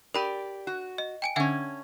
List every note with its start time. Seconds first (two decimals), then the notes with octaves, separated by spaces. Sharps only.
0.14 G4 A#4 D5 B5 D#7
0.67 F#4
0.98 D#5
1.22 G5 G#5 D7
1.36 D3 C#4 E5 F#5 G#5